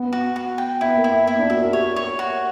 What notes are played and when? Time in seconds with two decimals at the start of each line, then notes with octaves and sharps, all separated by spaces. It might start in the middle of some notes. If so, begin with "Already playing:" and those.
Already playing: B3
0.13 F#4
0.36 F#4
0.58 G5
0.81 B3 E4
0.97 A#3
1.04 E4
1.12 B3
1.27 E4
1.38 D4
1.50 F#4 E5
1.62 A#4
1.73 G4 C#5
1.96 C#5
2.19 F#4